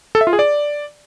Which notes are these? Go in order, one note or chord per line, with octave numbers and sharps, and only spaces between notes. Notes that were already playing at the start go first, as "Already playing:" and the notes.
A4
E5
F4
G#4
D5